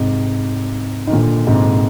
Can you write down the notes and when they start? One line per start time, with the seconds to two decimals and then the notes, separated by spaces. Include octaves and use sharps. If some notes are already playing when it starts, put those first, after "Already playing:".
Already playing: G#2 C3
1.07 D#3
1.12 A#2 D3
1.47 G#2 C3